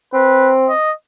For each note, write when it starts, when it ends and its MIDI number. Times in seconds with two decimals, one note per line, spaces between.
0.14 0.69 60
0.14 0.52 71
0.68 0.92 75